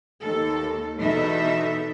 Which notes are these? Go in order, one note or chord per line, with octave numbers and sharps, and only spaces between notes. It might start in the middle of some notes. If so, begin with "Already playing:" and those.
D#2 A4
E2 B2 D#4 A4 E5